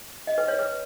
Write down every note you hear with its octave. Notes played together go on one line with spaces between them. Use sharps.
D#5
B4
C#5
B4